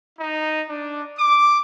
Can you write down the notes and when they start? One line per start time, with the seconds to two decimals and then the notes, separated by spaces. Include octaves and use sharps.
0.17 D#4
0.69 D4
1.17 D6